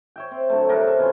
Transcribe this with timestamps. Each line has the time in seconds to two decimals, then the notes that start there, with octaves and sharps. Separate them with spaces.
0.16 C#5 E5 G5
0.31 C4
0.49 D3 F#3 A3
0.69 C3 G3 A#4 B4
0.87 A3 E5
0.98 B2 E3 C#4 F4